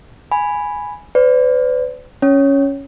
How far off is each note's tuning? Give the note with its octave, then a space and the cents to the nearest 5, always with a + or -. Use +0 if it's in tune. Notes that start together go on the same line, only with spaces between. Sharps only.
G#5 +0 B5 +0
B4 +40 D5 -30
C#4 +0 C#5 +0